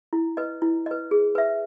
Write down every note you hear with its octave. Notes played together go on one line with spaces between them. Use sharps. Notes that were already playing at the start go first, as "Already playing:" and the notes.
E4
B4 D#5
E4
B4 D#5
G#4
B4 E5